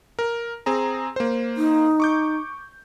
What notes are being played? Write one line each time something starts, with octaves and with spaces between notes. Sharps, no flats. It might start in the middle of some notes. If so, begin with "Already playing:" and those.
A#4
C4 G#4 A#5
A#3 C5
D#4
C#6 D6 G6